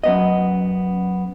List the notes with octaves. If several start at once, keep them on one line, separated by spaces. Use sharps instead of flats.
F#2 B3 D#5